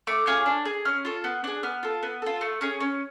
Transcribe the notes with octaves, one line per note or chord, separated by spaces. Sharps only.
A3 D6
C#4 F4 G#4
D4
G#4
C#4 F6
F4 A4
B3
D4 G#4
B3 F6
F4 A4
B3
F4 A4
A3
C#4 G#4
C#4